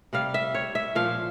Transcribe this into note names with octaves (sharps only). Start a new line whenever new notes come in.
C3 G3 F5
E5
C#5
E5
A#2 F3 F5